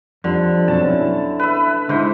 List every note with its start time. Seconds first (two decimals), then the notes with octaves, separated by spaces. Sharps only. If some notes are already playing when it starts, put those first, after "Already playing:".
0.24 F2 D3 F3 G3
0.68 B2 F#3 C4 A5
0.85 C#4 E4
1.39 B4 E5
1.89 G#2 D3 E4 C5